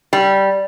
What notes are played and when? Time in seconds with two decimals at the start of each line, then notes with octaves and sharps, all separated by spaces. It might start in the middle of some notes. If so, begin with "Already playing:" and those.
0.13 G3